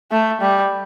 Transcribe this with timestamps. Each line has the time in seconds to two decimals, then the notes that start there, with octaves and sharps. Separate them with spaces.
0.11 A3
0.41 G3